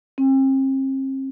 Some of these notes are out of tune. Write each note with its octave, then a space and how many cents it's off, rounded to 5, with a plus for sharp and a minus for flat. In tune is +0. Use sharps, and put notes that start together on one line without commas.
C4 +40